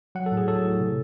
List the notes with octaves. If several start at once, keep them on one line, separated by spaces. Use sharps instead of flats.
F#3 F#5
A4
A2
G#4
F#3 A4
A2
C3